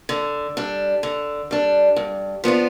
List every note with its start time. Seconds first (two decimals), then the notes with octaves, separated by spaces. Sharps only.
0.09 D3
0.57 G3 D4
1.03 D3
1.51 G3 D4
1.96 G2
2.44 F3 B3 D4 F4